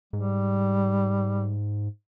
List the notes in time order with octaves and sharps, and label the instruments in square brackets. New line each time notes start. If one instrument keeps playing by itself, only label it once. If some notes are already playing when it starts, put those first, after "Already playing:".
[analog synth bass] G#2 [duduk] G3